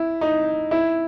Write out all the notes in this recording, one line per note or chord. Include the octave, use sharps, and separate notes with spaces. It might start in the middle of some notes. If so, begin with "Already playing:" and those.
Already playing: E4
D#4
E4